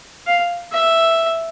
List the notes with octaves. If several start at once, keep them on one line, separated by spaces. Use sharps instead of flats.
F5
E5